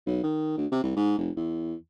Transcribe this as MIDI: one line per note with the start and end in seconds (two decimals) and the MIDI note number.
0.06 0.19 35
0.24 0.56 51
0.57 0.66 38
0.72 0.80 48
0.83 0.95 36
0.96 1.16 44
1.18 1.31 29
1.36 1.74 40